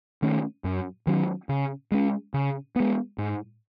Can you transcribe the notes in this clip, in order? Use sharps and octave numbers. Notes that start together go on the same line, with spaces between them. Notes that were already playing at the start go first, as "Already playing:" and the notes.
D#3 A3 C#4
F#2
D#3 F#3 C#4
C#3
G#3 C#4
C#3
G#3 B3
G#2